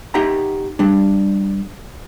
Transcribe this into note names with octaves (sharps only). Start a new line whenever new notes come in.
D#4 G4 E5 F#5 A#5
G3 D4